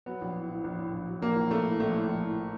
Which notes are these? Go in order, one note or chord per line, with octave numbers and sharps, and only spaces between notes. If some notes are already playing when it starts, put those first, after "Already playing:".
F#3 B3
A#1
A2
A2
A#1
A2
A#1
F#3
A#1 A#3
A#1
A#1 A3
A2
A#1 A3
A2
A#1
A2